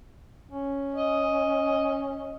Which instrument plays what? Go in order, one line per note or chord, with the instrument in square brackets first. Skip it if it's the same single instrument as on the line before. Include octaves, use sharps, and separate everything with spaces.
[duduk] C#4
[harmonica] D#5